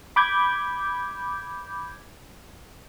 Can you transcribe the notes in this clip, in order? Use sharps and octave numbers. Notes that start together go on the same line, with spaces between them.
B5 D6 G6 G#6